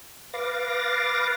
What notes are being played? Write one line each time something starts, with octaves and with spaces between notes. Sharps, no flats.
B4 F5 D6 A6 A#6